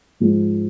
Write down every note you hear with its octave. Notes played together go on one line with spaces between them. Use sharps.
G#2 F3 G#3